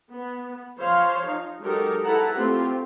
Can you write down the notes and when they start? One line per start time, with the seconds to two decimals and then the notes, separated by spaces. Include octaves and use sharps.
0.11 B3
0.79 F3 C5 C#5 F5
1.26 D#4
1.61 F#3 G#3 D#4 G4 A4 A#4
2.04 E4 A4 B4 F#5 A5 A#5
2.34 A3 C4 F4 G4